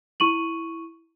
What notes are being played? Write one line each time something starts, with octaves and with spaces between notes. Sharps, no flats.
E4 C#6 D#7 F#7